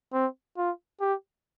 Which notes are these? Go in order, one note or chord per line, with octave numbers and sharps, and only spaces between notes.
C4
F4
G4